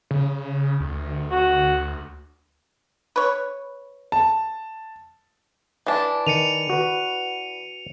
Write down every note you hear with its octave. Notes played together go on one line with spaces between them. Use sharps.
C#3
D2
F#4
B4 C#5
A5
E3 D4
D#3 C#7 D#7 F7
F#4 B4